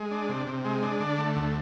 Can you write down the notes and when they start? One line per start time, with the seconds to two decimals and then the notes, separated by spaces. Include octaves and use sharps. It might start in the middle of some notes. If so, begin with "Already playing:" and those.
Already playing: G#3
0.11 D4
0.29 C3
0.47 C3
0.65 G#3
0.83 D4
1.00 D3
1.18 A3
1.36 D2